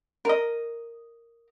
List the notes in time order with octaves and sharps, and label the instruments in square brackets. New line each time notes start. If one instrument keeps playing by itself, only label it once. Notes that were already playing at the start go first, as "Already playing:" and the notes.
[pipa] A#4 D#5